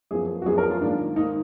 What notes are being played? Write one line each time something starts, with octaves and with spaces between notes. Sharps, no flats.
F#2 F3 B3 G#4
F#4
F#2 F3 B3 G#4
A#4
F4
G#2 D#3 A#3 D4
G#2 D#3 A#3 D#4